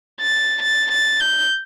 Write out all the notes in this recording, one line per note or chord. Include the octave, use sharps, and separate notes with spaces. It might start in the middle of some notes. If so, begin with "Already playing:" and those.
A6
A6
A6
G6